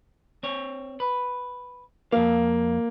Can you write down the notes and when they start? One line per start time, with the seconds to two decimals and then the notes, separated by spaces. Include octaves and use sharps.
0.43 C4 C#5
1.00 B4
2.12 F2 A#3 F5